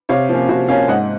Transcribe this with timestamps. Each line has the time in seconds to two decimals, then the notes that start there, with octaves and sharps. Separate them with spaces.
0.09 C3 C#5 F5
0.29 F3 A#3 C#4
0.49 C3 F#4
0.68 F3 A#3 C#4 C#5 F5
0.88 G#2 D#5 F#5